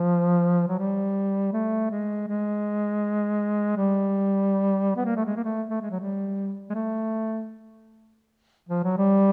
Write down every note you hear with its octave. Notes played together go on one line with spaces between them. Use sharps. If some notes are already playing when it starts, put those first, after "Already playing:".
Already playing: F3
F#3
G3
A3
G#3
G#3
G3
B3
A#3
A3
G#3
A#3
A3
A3
G#3
F#3
G3
G#3
A3
F3
F#3
G3